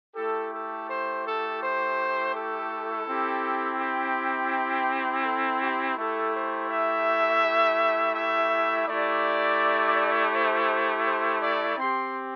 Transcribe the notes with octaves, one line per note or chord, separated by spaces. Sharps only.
A3 E4 G4 A4
A4
C5
A4
C5
A4
C4 E4 G4
G4
A4
G4
A3 E4 G4 A4
C5
E5
E5
A3 E4 G4 D5
C5
C5
D5
C4 G4 C6